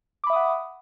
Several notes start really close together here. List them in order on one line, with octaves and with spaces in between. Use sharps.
D6 B5 E5 D#6 F#5